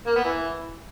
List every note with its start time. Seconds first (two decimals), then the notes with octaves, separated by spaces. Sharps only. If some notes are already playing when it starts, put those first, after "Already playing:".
0.07 A#3
0.16 B3
0.25 E3